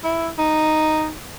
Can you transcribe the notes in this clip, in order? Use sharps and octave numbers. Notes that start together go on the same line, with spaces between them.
E4
D#4